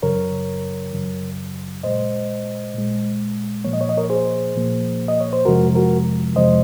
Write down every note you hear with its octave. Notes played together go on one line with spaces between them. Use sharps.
F#2 C#3 F#3 A#4 C#5
F#2 C#3 F#3
A#2 G#3 C5 D#5
A#2 G#3
A#2 F3 A#3 C#5
D#5
C#5
D#5
A#4 C#5
G#4 C5
A#2 F3 A#3
D#5
C#5
C5
F2 C3 F3 G#3 F#4 A#4
F#4 A#4
F2 C3 F3 G#3 C5 D#5